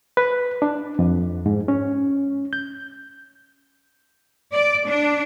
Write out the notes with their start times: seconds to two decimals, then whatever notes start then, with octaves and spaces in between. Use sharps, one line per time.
0.17 B4
0.62 D4
0.99 F2
1.46 G#2
1.68 C#4
2.53 G6
4.52 D5
4.87 D4